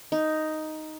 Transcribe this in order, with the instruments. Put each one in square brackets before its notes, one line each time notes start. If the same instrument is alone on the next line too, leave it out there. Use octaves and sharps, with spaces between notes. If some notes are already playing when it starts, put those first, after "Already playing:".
[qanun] D#4